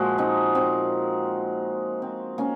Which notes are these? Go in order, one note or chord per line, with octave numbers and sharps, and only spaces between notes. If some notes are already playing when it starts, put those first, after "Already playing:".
Already playing: A#2 F3 G#3 F#4
C4 D#4
C4
C4
A#3 C#4